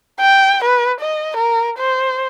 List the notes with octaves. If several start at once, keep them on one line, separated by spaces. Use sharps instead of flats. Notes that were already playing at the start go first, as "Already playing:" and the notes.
G5
B4
D#5
A#4
C5